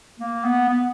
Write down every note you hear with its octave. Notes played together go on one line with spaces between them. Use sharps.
A#3
B3
B3